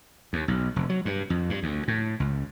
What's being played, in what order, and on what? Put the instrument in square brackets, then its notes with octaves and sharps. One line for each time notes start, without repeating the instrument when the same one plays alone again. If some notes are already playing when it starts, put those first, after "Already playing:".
[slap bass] D#2
B1
F1
F#3
G2
F2
G2
D2
A2
C#2